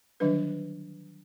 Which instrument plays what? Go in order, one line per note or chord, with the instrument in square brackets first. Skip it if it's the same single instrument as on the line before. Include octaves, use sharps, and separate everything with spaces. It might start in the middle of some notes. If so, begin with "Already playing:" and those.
[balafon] D3 D#3 F#3 G3 D4 B4